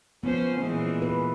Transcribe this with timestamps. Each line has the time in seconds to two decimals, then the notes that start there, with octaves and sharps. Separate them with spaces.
0.23 F3 B3 C#4 C5
0.61 A#2 E3 G#3
1.02 B4